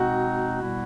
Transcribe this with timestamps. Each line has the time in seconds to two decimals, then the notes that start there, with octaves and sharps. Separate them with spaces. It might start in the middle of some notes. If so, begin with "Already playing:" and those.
Already playing: B2 G#3 C4 D#4 F#4
0.60 B2 G3 B3 E4